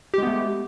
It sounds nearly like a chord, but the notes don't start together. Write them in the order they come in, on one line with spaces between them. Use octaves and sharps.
G4 G#3 B3 A3